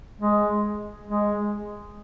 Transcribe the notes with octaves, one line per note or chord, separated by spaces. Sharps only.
G#3
G#3